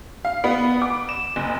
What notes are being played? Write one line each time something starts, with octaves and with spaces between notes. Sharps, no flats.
F5
B3
D6
E7
F#1